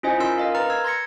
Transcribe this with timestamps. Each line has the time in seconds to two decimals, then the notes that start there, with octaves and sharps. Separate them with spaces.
0.03 C#4 E4 F4 C5 D#5 G#5
0.20 C#4 D#4 A#4 C6 E6
0.38 A#4 D#5 F5
0.54 B4 A#5 F6 A6
0.70 E6 G#6
0.84 C6 G#6 A#6 C#7